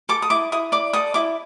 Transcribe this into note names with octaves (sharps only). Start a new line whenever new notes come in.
A4 D6
D#6
E4 D6
E4 D#6
D5 D6
A4 D#6
E4 D6